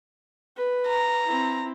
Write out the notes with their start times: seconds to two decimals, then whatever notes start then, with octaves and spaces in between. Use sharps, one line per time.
0.56 B4
0.88 A#5
1.26 C4 E4